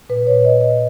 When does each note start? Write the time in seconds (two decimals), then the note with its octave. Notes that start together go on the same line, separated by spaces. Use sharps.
0.09 A#2 B4
0.27 C#5
0.45 D#5
0.61 D#5